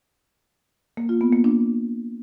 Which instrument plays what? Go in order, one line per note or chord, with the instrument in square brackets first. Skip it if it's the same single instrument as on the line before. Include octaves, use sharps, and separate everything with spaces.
[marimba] A#3
F4
B3
A#3
D4